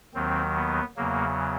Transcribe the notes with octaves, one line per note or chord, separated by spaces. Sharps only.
D#2 D#3 F#3 C4
B3
E2 C#3 F#3 A#3